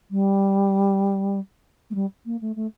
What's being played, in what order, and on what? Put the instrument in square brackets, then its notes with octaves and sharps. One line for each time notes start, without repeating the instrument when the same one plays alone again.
[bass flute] G3
A3
G3
A#3
A3
A3